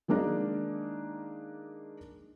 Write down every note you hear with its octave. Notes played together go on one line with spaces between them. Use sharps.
D#3 G#3 A#3 D4 D#4